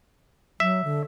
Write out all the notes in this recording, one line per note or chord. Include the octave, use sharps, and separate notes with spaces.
F#3 E5
D3